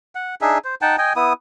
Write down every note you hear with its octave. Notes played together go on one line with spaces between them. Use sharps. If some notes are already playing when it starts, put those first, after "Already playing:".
F#5
D4 D#4 G#4 E5
C5
D#4 F#5 G5 A5
D#5 G5 G#5
B3 E4 D#6